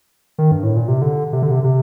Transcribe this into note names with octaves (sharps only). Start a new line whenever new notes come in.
D#3
G2
A2
A#2
C3
D3
C3
D3
C3
C3